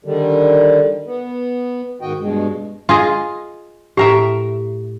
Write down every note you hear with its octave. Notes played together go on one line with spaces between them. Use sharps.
D3 D#3 G3
B3
G#2 D#3 F#4 D#5 G5
G2 B2 G#3
F4 G#4 D#5
A2 G4 A#4 E5